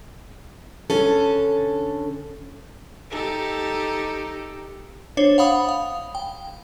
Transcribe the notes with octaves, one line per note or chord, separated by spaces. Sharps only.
D3 C#4 A4
D#4 G4 A4
D4 C5 C#5
F5 F#5 B5 D#6
F5
G5